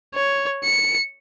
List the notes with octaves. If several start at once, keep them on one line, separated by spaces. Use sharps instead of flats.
C#5
C#7